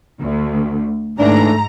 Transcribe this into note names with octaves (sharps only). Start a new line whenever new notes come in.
D2
D#2 G#2 E3 A3 D4 A#5